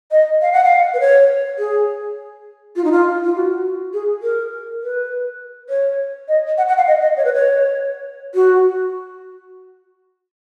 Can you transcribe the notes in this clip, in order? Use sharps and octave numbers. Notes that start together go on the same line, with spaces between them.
D#5
F5
F#5
F5
B4
C#5
G#4
F4
D#4
F4
F4
F#4
G#4
A#4
B4
C#5
D#5
F#5
F#5
F5
D#5
D#5
C#5
B4
C#5
F#4